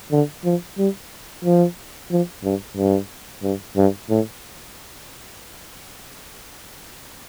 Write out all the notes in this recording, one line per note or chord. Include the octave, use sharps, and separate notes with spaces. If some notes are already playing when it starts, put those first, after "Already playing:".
D3
F3
G3
F3
F3
G2
G2
G2
G2
A2